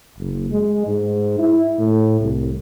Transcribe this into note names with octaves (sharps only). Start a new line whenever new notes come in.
F#1
G#3
G#2
E4
A2
C2